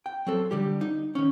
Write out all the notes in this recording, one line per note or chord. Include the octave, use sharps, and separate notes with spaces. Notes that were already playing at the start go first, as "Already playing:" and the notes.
G5
F#3 C4 A4
D3 G3 G4
D#4
D#3 C#4